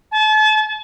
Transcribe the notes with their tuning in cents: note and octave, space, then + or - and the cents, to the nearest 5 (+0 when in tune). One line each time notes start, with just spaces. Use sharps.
A5 -35